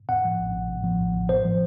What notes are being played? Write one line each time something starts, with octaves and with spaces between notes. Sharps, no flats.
A2 F#5
F3
A1
A1
A2
F3
A1
A1
A2 C5
F3